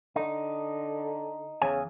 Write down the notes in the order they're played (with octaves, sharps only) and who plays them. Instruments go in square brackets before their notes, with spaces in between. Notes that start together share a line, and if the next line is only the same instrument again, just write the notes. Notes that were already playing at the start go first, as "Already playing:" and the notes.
[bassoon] D3 [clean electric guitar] D#4
[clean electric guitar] E2 G#5 [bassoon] C#3